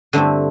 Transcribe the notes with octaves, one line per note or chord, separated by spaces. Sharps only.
G2 D3 A3 C4 E4